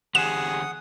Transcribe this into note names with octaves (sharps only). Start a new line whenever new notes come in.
D3 E3 G4 G#4 F#5 D#6 E7